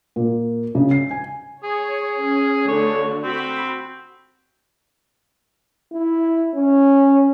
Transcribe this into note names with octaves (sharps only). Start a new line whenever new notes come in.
A#2
C#3
C7
G#5
G#4 C#5
C#4
D3 A3 F#4 C#5
C4 F#4 B5
E4
C#4